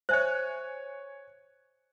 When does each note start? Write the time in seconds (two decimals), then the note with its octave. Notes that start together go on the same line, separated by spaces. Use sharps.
0.09 C5 C#5 E5 G#5 F#6